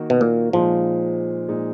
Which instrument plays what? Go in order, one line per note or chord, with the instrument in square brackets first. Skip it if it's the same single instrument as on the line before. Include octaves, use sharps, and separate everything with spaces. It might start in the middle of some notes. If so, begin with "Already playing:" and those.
Already playing: [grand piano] D#3 A#3 D#4 F#4 A#4
[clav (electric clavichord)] B2
A#2
[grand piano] A#2 G#3 D#4 [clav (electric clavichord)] F3
[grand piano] A#2 G#3 D#4